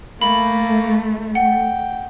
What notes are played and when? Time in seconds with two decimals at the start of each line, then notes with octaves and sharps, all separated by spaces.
0.21 A3 A#3 B5
1.35 F#5 G5